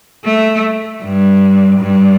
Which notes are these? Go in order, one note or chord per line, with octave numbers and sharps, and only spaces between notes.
A3
G2
G2